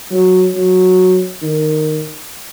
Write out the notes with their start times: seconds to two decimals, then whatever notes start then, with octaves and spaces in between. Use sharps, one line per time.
0.11 F#3
0.54 F#3
1.42 D#3